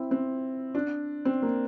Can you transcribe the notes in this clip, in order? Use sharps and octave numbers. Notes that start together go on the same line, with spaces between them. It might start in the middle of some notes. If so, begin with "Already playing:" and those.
Already playing: C4 E4
C4
D4
C4
A#3